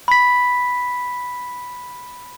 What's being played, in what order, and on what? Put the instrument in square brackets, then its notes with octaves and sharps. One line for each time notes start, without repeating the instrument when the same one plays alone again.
[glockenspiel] B5 B6